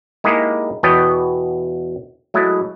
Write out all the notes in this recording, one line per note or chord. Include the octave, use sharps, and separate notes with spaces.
G#3 A#3 D#4 E4 G4 G#4
E2 B2 B3 C#5 D#5 G5
F#3 G#3 A3 E4